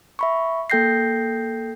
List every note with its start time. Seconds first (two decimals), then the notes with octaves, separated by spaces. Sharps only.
0.19 E5 B5 C#6
0.70 A#3 A4 G5 G6 A#6 C7